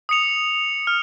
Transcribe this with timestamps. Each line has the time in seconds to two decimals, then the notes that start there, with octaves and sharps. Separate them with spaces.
0.09 D#6 C#7 F7
0.87 F6